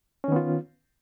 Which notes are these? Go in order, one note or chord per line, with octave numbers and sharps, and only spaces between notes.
D#3 B3 C#4 F4